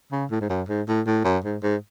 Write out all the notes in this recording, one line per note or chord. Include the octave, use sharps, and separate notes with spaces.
C#3
A2
G#2
F#2
G#2
A2
A2
F#2
G#2
G#2